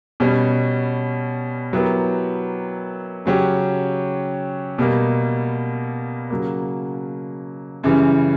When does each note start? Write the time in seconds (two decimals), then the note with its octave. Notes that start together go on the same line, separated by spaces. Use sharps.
0.20 B2 G3 C#4
1.73 F#3 B3 E4 G4 A#4
3.25 C#3 F#3 C#4 G4
4.78 B2 G3 A#3
6.30 C#3 F#3 A#3
7.84 F#2 C#3 E3 G3